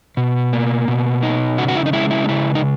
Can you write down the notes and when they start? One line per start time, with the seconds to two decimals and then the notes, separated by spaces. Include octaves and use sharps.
0.17 B2
0.53 A#3
0.88 B2
1.23 D#4
1.58 C#3 F#4
1.68 F#4
1.76 E4
1.86 D#4
1.93 G#3 E4
2.11 E4
2.24 D#4
2.29 C#3 E4
2.55 D#4